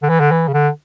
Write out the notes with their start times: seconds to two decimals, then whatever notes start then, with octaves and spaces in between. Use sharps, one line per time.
0.03 D3
0.09 E3
0.20 D3
0.31 E3
0.48 C#3
0.53 D3